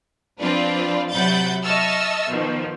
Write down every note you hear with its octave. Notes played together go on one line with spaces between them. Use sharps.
F3 C4 D4 F4 B4 D5
C3 F#3 F#5 B5 G6 A6
D#5 E5 A5 C#6 E6 F6
B2 D#3 F3